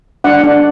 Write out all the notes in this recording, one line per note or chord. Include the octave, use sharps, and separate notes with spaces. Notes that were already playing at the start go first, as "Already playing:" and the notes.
D4 F#5
D4